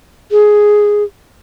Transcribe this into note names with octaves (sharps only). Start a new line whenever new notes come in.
G#4